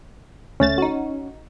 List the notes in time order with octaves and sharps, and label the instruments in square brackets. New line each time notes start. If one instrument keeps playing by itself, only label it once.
[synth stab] D2 A3 A6 [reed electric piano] C#4
[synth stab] D#4 F#4